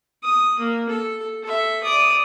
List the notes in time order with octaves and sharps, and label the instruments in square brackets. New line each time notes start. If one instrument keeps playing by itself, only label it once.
[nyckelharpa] D#6
A#3
A4
A4 E5
D5 D#6